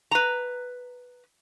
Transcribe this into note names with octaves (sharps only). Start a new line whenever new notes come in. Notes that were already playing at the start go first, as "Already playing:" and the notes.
B4 A#5